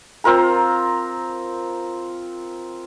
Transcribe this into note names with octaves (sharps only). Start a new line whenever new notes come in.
C4 F4 A#4 A#5